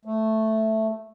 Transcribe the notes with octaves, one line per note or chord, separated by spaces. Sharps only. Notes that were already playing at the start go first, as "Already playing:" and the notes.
A3